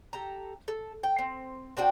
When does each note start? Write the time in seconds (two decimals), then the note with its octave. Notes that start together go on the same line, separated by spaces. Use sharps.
0.13 G4 A4 A#5
0.68 A4
1.03 G5
1.19 C4
1.77 C4 D4 F#4 G5